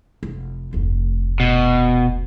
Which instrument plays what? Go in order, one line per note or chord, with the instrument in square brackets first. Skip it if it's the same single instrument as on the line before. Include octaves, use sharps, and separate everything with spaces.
[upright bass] F1
F1 D2
[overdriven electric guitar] B2